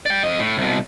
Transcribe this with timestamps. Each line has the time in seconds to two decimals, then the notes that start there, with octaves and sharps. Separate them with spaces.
0.06 D5 G5
0.23 F2 D#5
0.39 A2
0.58 C2 B2